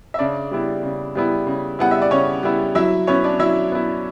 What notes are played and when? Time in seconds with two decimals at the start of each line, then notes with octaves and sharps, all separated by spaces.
0.14 E5
0.19 C#3 D4 D5
0.51 G3 B3 E4
0.83 C#3
1.15 G3 B3 E4
1.47 C#3
1.79 G3 B3 E4 F#5
1.91 E5
2.02 D5
2.11 C#3 C#4 C#5
2.43 G3 B3 E4
2.75 F#3 E4 E5
3.07 B3 C#4 E4 C#5
3.24 D4 D5
3.39 F#3 E4 E5
3.72 B3 E4